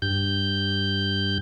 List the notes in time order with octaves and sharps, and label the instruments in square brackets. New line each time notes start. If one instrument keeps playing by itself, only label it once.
[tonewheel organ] G2 G6